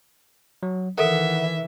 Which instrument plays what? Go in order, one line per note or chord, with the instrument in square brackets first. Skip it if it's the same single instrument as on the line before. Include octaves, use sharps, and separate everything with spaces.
[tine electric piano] F#3
[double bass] D#3 E3 [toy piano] A4 A#4 [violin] E5 [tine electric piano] F#5